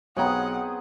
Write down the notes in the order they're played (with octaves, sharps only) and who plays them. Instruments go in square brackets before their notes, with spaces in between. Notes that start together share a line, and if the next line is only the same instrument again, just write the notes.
[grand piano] B1 [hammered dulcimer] B3 C4 G#4 [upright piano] C#5 G5 A#5 [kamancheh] F#5